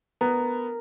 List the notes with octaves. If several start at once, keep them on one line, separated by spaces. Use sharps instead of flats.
B3 A#4